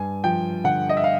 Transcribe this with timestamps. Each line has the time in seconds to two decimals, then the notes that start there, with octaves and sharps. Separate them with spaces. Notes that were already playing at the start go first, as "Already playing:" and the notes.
Already playing: G2 G#5
0.24 F3 G5
0.64 D3 F#5
0.89 D#5
0.97 E5
1.04 F5